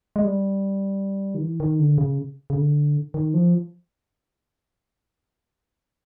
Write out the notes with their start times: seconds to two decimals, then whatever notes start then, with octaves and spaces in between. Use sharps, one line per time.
0.16 G#3
0.24 G3
1.35 D#3
1.41 E3
1.60 D#3
1.79 D3
1.98 C#3
2.50 C#3
2.56 D3
3.14 D#3
3.34 F3